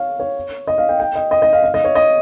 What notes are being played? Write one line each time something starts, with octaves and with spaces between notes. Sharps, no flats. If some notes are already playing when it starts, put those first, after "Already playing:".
Already playing: C#5 F5
C#5
D#5
F5
G5
G5
D#5
D#5
D#5
F5
F5
D#5
C#5
D#5